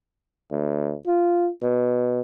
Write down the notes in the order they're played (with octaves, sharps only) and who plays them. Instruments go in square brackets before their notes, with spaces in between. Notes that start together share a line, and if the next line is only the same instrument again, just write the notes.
[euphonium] D2
F4
B2